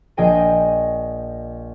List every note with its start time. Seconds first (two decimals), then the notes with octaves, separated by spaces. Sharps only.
0.17 A#1 G#4 D#5 G5 G#5 D#7